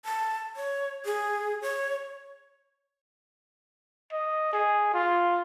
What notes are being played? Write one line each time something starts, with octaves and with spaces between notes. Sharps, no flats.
A5
C#5
G#4
C#5
D#5
G#4
F4